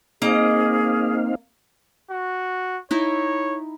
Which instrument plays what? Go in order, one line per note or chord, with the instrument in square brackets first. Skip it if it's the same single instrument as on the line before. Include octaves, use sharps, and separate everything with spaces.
[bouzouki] A#3 D#5 A#5 [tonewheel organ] C4 D#4 F5 [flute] G#4
[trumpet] F#4
[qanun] D#4 E4 [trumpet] C#5